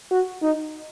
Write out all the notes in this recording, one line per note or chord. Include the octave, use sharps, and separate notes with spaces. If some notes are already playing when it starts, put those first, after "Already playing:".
F#4
D#4